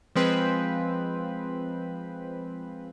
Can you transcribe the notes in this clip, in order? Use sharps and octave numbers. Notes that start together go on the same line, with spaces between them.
F3 G#3 C4 B4